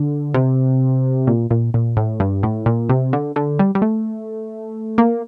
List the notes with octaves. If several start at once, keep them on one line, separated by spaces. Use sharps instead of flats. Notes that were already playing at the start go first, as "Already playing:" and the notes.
Already playing: D3
C3
A#2
A#2
A#2
A2
G2
A2
A#2
C3
D3
D3
G3
G3
A3
A#3